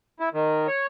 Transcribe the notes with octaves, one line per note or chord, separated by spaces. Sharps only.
E4
D#3
C#5